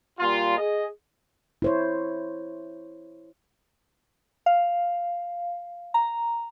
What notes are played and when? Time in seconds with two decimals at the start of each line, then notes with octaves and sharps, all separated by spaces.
0.19 A#2 G3 F4
0.58 G#4 D#5
1.62 E4 C5 C#5
4.46 F5
5.94 A#5